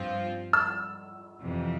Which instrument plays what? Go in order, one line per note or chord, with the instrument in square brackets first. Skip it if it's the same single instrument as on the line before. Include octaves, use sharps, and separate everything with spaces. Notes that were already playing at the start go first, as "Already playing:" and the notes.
Already playing: [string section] G2 F3 C4 F4
[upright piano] E6
[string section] F2 C3 E3